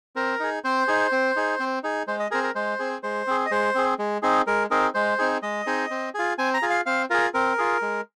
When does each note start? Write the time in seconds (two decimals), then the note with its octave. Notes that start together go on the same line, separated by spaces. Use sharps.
0.16 C4 A#4
0.40 D#4 G#4
0.64 C4 C5
0.88 D#4 G#4
1.12 C4
1.36 D#4 G#4
1.60 C4
1.84 D#4 G#4
2.08 G#3 C5
2.20 D#5
2.31 C4 G#4 A#4
2.43 A#4
2.55 G#3 C5
2.79 C4 G#4
3.03 G#3 C5
3.27 C4 G#4
3.46 D#5
3.51 G#3 C5
3.75 C4 G#4
3.99 G#3
4.23 C4 D#4 G#4
4.47 G#3 A#4
4.71 C4 D#4 G#4 A#4
4.94 G#3 C5
5.19 C4 D#4 G#4
5.42 G#3 D#5
5.66 C4 D#4 G#4
5.91 C4
6.14 F4 G#4
6.38 C4 G#5
6.54 A#5
6.62 F4 G#4
6.70 F5
6.86 C4 F5
7.10 F4 G#4 A#4
7.34 C4 A#4
7.58 F4 G#4
7.82 G#3